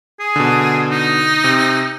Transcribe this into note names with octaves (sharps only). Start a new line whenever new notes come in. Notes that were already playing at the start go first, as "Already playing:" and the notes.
G#4
B2 D3
D#4
C3